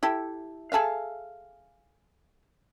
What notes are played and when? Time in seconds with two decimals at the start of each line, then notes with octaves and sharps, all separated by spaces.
0.03 E4 G4 A4
0.72 G#4 A4 E5 F5